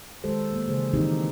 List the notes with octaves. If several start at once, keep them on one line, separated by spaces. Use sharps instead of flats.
D#3 G#3 G4 A4 C5
A#3
C#3 E3 G#4 C5
D#3 E3 C4 D#4 G4